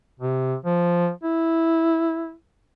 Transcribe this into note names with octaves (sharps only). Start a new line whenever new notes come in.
C3
F3
E4